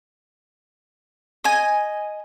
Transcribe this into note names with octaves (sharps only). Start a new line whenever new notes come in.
D#5 G#5